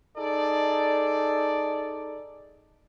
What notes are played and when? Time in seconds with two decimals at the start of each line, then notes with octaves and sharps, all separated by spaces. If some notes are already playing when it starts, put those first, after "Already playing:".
0.16 D#4 G#4 A4 D5